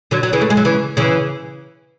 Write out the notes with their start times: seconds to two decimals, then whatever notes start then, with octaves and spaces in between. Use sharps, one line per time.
0.11 D3 F#3
0.23 F#3
0.33 C#3 E3
0.41 A3
0.50 G#3
0.57 F#3
0.65 C#3 E3
0.97 C#3 E3